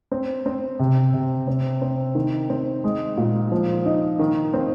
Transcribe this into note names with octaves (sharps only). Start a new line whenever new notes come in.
C4
C4
C3
C3
C4
C4
D#3
C4
G#3
A#2
F3
D#4
D#3
C4